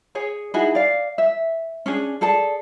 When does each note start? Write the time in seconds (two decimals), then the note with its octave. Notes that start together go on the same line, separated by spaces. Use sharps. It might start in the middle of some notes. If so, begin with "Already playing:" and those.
0.15 G#4 C#5 G#5
0.54 D#4 E4 F#4 G#4
0.75 D5 F5
1.18 E5
1.86 C#4 D4 G#4
2.21 G#4 A4 D5 A5